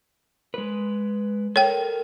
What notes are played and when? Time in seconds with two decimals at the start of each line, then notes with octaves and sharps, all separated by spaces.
0.54 G#3 B4
1.56 A4 A#4 C#5 G5